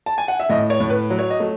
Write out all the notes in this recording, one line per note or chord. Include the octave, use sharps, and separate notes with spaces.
A5
G#5
F#5
E5
A2 D#5
C#5
A2
B4
F#3
C#5
D#5
A3